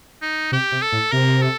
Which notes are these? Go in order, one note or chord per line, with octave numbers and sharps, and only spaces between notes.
D#4
C3 G4
C3
A4
A2
C3 A#4
A4